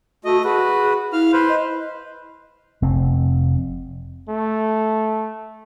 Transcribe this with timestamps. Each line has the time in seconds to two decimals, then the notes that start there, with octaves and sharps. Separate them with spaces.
0.25 A3 F#4 D#5
0.44 F#4 G#4 B4
1.13 E4 F5 F6
1.33 B4 C5
1.49 D#5
2.82 F1 C4
4.29 A3